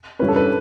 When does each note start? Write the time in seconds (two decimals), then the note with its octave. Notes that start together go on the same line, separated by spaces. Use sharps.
0.19 G2 E3 G3 C#4 B4
0.28 A4
0.36 B4